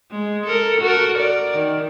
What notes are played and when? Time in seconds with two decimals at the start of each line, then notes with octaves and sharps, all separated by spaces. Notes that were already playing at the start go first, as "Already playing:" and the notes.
0.11 G#3
0.47 A4 A#4
0.82 F#4 A4 A#4
1.19 A#4 D5
1.55 D#3